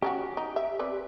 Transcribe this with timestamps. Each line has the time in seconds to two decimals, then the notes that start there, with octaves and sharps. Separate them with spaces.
0.02 C#4 D#4 F#4 G4
0.37 D#4
0.56 E5
0.79 C4 B4 D5